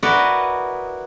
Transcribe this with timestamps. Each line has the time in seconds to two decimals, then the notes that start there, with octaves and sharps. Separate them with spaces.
0.03 E4 F#4 A#4 B4 D5 D#5